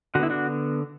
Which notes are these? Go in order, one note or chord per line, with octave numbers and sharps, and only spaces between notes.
D3 B3 E4 F#4
D4 F#4